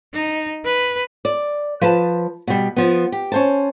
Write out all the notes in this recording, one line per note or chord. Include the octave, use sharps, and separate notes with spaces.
D#4
B4
D5
F3 B4 A5
B2 G3
F3 B3
G4
C#4 C5 A5